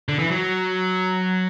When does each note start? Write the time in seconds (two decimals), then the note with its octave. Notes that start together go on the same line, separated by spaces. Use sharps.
0.09 D3
0.19 E3
0.31 F#3